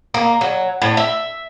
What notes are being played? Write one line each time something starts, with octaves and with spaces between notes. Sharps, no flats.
A#3
F#3
A2
E5